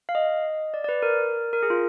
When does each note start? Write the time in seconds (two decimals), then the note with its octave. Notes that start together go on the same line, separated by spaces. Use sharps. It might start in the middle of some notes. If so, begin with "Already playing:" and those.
0.09 F5
0.15 D#5
0.74 D5
0.84 D5
0.89 B4
1.03 A#4
1.53 A#4
1.63 G#4
1.70 F4